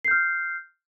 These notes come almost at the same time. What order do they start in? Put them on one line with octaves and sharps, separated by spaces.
C7 G6 F6